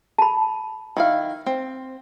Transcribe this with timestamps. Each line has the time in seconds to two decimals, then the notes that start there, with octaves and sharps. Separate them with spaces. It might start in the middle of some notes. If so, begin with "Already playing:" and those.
0.18 A5 B5
0.97 D#3 E4 F5
1.46 C4